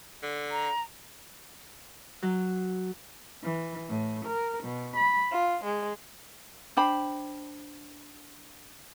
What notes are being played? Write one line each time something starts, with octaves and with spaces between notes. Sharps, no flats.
D3
A#5
F#3
E3
A2
A#4
B2
B5
F4
G#3
D4 C5 G5 B5